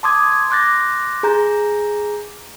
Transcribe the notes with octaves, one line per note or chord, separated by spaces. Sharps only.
A5 C6 D6 D#6 G#6
C6 D6 F#6 G6 A6 A#6
G#4 A#5 G6